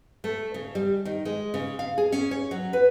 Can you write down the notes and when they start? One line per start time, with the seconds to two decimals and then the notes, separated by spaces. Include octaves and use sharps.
0.24 A3
0.54 C#3
0.75 G3
1.05 D#3
1.25 G#3
1.54 C#3
1.79 F5
1.98 G#4
2.12 C#4
2.31 C#5
2.51 F#3
2.73 B4